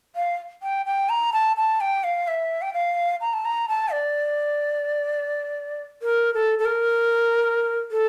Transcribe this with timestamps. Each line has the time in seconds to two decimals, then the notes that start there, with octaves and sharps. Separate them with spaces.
0.16 F5
0.62 G5
0.86 G5
1.09 A#5
1.33 A5
1.57 A5
1.81 G5
2.04 F5
2.28 E5
2.62 G5
2.74 F5
3.21 A#5
3.33 A5
3.45 A#5
3.68 A5
3.92 D5
6.02 A#4
6.34 A4
6.59 A4
6.65 A#4
7.91 A4